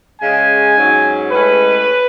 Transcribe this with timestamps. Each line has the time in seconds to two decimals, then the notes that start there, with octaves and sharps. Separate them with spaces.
0.21 C#3 G#3 C#4 G#5
0.76 G#2 F#3 C#4
1.31 A2 G#3 C#4 B4